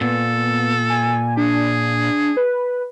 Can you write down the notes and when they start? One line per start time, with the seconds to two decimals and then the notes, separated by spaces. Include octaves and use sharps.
0.01 A#2 B3 A4
0.89 G#5
1.37 D4 G#4
2.37 B4